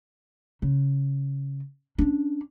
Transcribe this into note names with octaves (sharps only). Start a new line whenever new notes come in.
C#3
C#4 D4